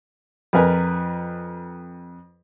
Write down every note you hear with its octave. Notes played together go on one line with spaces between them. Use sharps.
F2 A#4 B4 G#5 A#5